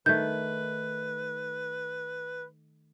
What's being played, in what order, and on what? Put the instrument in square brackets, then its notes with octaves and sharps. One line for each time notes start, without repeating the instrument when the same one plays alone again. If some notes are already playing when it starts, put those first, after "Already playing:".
[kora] D#3 A3 [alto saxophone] B4 [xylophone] G6